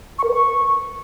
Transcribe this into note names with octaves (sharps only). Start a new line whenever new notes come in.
C#6
A#4
B4
C#6